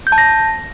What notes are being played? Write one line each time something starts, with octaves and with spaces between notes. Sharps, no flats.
G6
A5
A#6